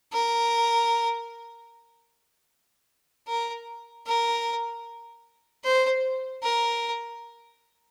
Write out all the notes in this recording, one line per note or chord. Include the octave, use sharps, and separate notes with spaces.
A#4
A#4
A#4
C5
A#4